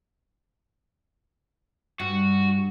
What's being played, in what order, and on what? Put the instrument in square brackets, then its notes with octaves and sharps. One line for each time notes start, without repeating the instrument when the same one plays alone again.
[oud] G2 [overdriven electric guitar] F#4